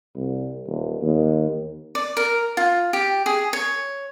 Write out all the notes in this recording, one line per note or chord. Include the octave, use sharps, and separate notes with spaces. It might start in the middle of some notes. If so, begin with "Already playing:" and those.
C2
D#1
D#2
D5
A#4
F4
G4
G#4
C#5